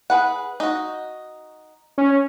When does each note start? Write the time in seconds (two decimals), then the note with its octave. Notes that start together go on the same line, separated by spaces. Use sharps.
0.10 G#4 B4 F#5
0.60 D#4 F#4
1.98 C#4